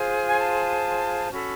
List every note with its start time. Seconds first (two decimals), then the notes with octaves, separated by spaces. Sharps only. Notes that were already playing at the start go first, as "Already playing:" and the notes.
Already playing: F4 G#4 C5
0.26 G#5
0.39 A5
1.31 C#4 F#4 A4 B5